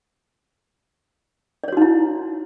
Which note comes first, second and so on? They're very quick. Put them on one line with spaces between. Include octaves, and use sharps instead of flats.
D5 C#5 F#4 D#4 E4